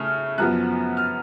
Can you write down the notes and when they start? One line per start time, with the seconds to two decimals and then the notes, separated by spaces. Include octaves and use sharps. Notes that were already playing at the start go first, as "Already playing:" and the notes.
Already playing: C#3 A3 F6
0.38 F#2 F3 B3 F#6
0.97 F6